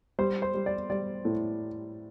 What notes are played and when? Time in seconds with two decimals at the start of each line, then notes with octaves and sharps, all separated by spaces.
0.19 G3 C5
0.42 C5
0.54 G3
0.66 D5
0.90 G3 D5
1.25 A2